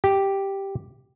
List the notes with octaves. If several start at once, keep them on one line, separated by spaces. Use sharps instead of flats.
G4